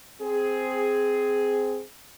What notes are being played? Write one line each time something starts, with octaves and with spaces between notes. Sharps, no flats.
C4 G#4